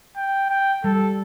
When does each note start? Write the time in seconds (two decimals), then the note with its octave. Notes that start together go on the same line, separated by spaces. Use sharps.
0.17 G5
0.51 G5
0.84 G3 A4